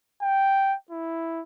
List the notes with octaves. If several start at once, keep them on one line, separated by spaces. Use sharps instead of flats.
G5
E4